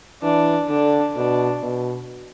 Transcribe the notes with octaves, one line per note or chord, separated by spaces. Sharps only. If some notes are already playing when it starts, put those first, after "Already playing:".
E3 D4
D3 D4
B2 D4
B2